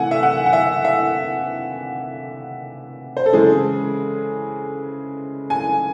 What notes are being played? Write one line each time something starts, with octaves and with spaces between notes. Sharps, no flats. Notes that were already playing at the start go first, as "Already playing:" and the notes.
Already playing: C3 E3 A3 F#5 G#5
E5
F#5
F#5
E5
E5
C5
A4
C#3 E3 G#3 G#4
G#5